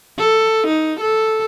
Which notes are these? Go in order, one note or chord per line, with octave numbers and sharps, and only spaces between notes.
A4
D#4
A4